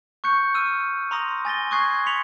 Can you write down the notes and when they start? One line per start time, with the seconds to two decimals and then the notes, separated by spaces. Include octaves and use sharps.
0.24 C#6 F#6 G6 C#7
0.55 E6 F6 D#7
1.11 A#5 C6 D#6 A#6
1.45 G#5 A6 A#6 G7
1.71 C#6 D#6 F#6 G#6 C7
2.06 C6 B6 C#7 F7